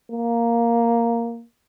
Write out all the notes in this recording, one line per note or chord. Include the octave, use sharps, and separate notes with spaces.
A#3